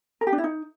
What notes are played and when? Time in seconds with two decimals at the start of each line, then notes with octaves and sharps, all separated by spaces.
0.21 A#4
0.27 G4
0.32 D4
0.38 E4
0.44 D#4